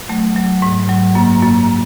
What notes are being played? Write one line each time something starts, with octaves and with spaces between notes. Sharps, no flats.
F#3 A3
F#3
G#2
F#3
F#2 A#3
F#2 A#3